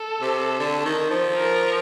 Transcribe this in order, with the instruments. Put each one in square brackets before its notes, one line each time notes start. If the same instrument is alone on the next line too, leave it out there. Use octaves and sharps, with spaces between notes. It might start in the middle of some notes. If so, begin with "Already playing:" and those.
Already playing: [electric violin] A4
[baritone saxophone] C3
D3
D#3
F3
[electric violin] A#4